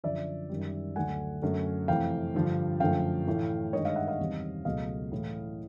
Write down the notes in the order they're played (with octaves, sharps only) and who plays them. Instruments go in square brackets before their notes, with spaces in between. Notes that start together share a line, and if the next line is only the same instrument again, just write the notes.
[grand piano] F#2 D3 F3 D5 E5
F#2 D#3 G3
D2 D3 F#3 A3 F#5 G#5
F#2 D3 F#3 A3
F2 C3 E3 A3 F5 G5
G2 D3 F3
F#2 D3 F3 A3 F5 G5
A2 E3 A3
G2 D#3 G#3 C#5 D#5
D#5 F5
E5 F#5
D#5 F5
E2 C3 D#3 G3
C#2 B2 F#3 A3 D#5 F5
A2 E3 A3